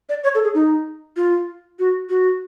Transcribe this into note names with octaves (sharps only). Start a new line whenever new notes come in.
D5
C#5
A4
G#4
D#4
F4
F#4
F#4